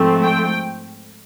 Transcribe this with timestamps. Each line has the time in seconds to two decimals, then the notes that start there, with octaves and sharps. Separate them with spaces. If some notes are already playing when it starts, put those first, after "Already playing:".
Already playing: G#2 F3 A3 C4
0.24 G5